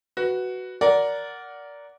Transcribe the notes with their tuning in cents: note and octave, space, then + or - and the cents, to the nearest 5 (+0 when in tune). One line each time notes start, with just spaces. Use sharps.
F#4 +5 B4 +0
A#4 +0 D5 -20 F#5 +0